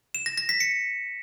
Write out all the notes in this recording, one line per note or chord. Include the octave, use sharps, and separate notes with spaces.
E7
A#6
A#6
B6
C#7